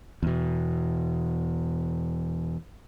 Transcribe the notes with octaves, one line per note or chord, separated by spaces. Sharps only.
E2 B2